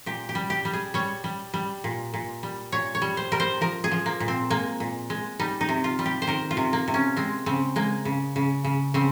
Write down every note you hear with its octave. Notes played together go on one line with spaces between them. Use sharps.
A#2 G4
G4
G3
G4
G3
G#4
G3 C#5
G3
G3
A#2
A#2
G3
A#2 C#5
C#5
G3
C5
G3 A#4
C5
F3 A#4
G#4
F3
A#3
A#2
C4
G#3 A#3
A#2
G#3
G3 D#4
D#4
C3
F4
G3
G4
C5
D#3 A#4
F4
C3
A#3
C3
C#4
G#3 C4
C#3 C4
G#3 A#3
C#3
C#3
C#3
C#3 C4